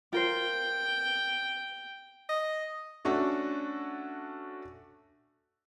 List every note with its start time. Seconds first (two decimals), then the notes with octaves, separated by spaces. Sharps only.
0.13 F4 A#4 C5 G5
2.29 D#5
3.05 A3 C#4 D4 F#4 A4